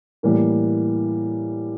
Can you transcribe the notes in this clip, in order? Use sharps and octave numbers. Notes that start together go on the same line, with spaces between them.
A2 E3 G3 A#3